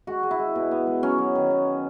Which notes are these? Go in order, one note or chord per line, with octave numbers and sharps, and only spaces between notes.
G#3 F#4
G#3
E4
G#3
B2
B3
G#3
F#3 C#4
F#3
D#3
B3